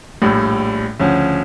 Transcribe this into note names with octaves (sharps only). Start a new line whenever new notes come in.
A#1 A2 G3
D2 C#3 F3 C#4